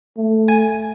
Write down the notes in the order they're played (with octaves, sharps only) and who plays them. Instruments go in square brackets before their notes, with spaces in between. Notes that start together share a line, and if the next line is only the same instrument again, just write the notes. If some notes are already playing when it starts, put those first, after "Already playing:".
[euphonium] A3
[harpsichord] G#5